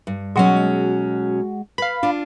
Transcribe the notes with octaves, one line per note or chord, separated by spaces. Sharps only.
G2
B2 F#3 G#3 C#4 F#4
B4 F5 B5
D4 F4